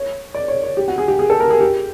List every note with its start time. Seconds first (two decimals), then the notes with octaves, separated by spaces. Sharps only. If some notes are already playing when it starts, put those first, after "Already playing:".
Already playing: C#5
0.34 D5
0.48 C#5
0.63 C#5
0.77 G4
0.88 F#4
0.98 G#4
1.08 G4
1.19 G#4
1.30 A4
1.40 A#4
1.50 G#4
1.61 G4